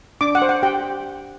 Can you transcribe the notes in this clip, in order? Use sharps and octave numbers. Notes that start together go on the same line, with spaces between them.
D4 D6
F#5
C5
F#5
G4 G5